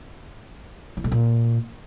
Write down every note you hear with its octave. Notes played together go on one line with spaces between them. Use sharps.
E3
A2
A#2